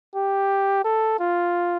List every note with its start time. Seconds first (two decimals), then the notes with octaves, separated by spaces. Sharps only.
0.16 G4
0.85 A4
1.20 F4